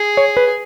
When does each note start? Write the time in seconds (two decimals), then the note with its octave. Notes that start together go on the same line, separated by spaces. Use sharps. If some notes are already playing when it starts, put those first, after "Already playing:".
Already playing: G#4
0.17 C#5
0.37 B4